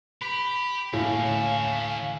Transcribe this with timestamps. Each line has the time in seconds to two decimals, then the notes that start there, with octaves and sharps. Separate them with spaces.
0.22 G4 B5
0.93 D2 A2 A#3 C#4 F5
1.25 D3 E5